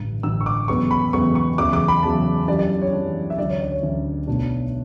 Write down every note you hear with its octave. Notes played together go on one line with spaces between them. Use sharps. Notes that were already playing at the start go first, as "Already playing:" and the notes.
Already playing: A1 G2 D3
A1 G2 D3 E6
C#6
D6
E2 C#3 F#3 B3 C#6
B5
E2 C#3 F#3 B3 C#6
C#6
E2 C#3 F#3 D6
D6
B5
E2 C#3 F#3 A5
F#2 E3 G3 D4 D5
D5
C#5
F#2 E3 G3 D4
E5
D2 D3 F#3 C#4 D5
C#5
D5
C#5
D2 D3 F#3 C#4
B1 B2 F#3 A3 D4